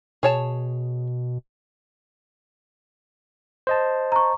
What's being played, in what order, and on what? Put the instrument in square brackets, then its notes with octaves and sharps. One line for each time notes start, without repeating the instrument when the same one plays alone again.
[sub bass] B2 [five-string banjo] G#4 C#5 A5
[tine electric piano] C5 D#5 A5
[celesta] A#5 C#6